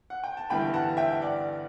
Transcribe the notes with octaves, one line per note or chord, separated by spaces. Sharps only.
F#5
G5
A5
G1 G2 E3 G5 B5
F#5 A5
E5 G5
D5 F#5